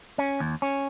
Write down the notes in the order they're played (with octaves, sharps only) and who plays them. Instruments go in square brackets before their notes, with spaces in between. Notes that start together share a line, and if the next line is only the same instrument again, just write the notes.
[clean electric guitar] C#4
D#2
C#4